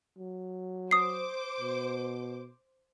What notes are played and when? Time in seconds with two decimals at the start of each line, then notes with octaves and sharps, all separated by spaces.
0.18 F#3
0.91 C5 D6 D#6 C7
1.60 B2